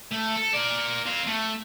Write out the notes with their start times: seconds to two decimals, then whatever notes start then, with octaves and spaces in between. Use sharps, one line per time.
0.12 A3
0.37 A4
0.54 A#4 D5
1.06 C4 F5
1.27 A3